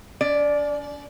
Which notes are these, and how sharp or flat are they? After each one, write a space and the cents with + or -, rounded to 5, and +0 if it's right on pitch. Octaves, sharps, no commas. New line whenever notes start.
C#4 +45 D5 +0